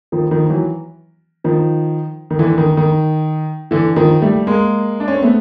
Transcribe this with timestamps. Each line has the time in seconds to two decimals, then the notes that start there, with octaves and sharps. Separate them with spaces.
0.12 D#3 F3
0.31 D#3 F3
0.50 E3 F#3
1.44 D#3 F3
2.31 D#3
2.39 D3 E3
2.58 D#3
2.77 D#3
3.71 D3 E3
3.96 D#3 F3
4.22 G3 A3
4.47 G#3 A#3
5.00 D4
5.08 C#4
5.15 C4
5.23 A3 B3